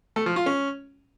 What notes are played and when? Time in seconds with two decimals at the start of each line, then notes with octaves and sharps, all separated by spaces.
0.16 A3
0.26 F3
0.36 F4
0.46 C#4